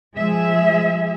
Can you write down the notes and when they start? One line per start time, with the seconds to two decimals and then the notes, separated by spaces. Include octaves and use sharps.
0.15 F3 G#3 G#4 E5